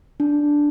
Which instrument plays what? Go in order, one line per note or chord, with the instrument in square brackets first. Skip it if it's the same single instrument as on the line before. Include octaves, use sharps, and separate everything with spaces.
[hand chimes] D4